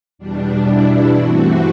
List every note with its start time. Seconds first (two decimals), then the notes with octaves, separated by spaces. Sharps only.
0.19 E2 B2 G3 D4
0.67 E4
1.15 G2 E3 A3 C4 F#4